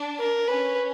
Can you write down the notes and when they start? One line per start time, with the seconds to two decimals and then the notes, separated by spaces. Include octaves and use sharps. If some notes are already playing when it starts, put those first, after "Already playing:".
Already playing: D4
0.19 A#4
0.48 C#4 B4